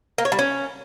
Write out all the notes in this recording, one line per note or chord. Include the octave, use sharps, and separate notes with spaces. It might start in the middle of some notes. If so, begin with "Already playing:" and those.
A#3
C#5
G3
C#4